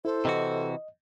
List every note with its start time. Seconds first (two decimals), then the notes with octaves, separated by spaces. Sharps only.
0.05 E4 A4 C5
0.25 C3 E3 F#4 D#5